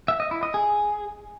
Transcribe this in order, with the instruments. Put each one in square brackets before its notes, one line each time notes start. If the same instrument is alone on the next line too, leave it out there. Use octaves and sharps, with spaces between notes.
[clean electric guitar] E5
D#5
E4
D#5
G#4